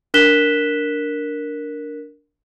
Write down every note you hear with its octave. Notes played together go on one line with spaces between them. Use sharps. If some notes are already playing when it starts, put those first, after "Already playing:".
D4 A#4 F#6 B6 E7 G7